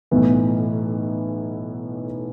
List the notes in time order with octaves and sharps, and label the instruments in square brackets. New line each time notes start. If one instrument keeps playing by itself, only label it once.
[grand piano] B1 A2 E3 B3 E4